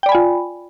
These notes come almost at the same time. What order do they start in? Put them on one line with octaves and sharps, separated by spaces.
G5 D5 B5 G#5 F4